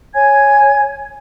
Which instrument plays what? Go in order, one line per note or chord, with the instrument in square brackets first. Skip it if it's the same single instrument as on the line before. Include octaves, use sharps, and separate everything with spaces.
[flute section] C#5 G#5 G#6